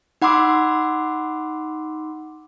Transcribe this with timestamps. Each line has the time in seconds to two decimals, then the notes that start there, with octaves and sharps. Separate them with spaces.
0.22 D#4 F#5 B5 C6 D6 E6